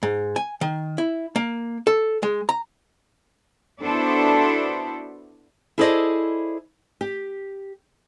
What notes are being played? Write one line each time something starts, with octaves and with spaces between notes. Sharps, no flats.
G#2
G#5
D#3
E4
A#3
A4
G#3
A#5
B3 D4 E4 F#4 A4 C5
E4 G#4 A4 C5 D5 D#5
G4